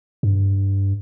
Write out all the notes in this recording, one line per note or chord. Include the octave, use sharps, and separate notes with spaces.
G2